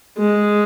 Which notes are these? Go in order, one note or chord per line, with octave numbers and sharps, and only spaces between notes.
G#3